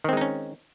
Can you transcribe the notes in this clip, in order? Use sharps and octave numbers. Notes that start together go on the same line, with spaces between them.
D#3 G#3 C4 C#4 D#4